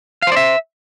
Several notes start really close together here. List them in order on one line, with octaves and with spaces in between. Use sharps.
F5 C5 D5 E5